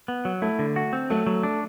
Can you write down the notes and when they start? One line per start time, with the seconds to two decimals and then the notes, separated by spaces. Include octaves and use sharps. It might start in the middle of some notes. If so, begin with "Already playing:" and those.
0.08 B3
0.25 F#3
0.42 A3 E4
0.59 D3
0.76 F#4
0.93 C4
1.10 F#3 A3
1.27 F#3
1.43 D4